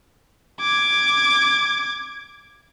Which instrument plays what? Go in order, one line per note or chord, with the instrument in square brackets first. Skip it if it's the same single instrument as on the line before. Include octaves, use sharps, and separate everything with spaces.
[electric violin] D6 G#6